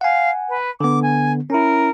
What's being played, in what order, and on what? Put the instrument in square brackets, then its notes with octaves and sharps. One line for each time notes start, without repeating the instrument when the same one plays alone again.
[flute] F5 [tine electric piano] F#5 G#5
[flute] B4
[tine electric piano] D3 B3 [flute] D6
[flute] G#5
[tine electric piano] C#4 E4 [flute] A#4